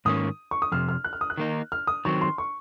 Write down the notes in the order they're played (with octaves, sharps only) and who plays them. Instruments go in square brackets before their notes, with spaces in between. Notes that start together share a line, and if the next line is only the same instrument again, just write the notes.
[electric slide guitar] G#2 D#3 A#3 C#4 [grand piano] D#6
[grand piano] C#6
D#6
[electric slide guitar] F2 C3 [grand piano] F6
[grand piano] F6
F#6
F6
D#6
F#6
[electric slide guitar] D#3 A#3 D#4
[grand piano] F6
D#6
[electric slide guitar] D#3 F#3 C4 [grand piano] C#6
[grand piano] C6
C#6